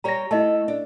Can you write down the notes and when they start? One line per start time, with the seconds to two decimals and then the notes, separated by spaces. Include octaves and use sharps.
0.04 G3 G4 C#5 A#5 A#6
0.31 A3 E4 D#5 A5
0.68 D4